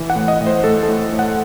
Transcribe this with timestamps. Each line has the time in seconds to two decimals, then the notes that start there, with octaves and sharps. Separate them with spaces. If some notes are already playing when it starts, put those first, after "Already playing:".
Already playing: E3
0.10 F#5
0.16 A2
0.28 D#5
0.41 A2
0.47 C5
0.64 A2 A4
0.83 A4
0.88 A2
1.12 A2
1.19 F#5